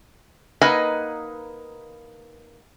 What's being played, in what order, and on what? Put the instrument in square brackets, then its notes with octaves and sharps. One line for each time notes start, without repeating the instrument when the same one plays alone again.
[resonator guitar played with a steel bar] A#3 D#4 B4 D#5 F#5 G#5